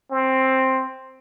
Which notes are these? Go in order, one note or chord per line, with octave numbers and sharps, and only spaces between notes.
C4